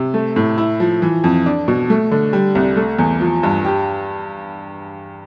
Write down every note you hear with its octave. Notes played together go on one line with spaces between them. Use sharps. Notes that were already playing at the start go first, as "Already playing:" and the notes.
Already playing: C3
A3
A2
E4
F3
E3
F2
D4
B2
A3
D3
G3
C2
A3
E2
F3
G2
G4